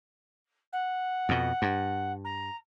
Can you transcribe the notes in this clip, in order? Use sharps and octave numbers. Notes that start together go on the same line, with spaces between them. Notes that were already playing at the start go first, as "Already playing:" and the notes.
F#5
F2 B2
G2
A#5